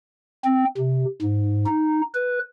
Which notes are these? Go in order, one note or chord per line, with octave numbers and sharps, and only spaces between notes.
C4
C3
G#2
D#4
B4